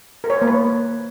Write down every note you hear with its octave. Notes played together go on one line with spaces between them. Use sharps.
A#4
C#5
C5
A#3
B4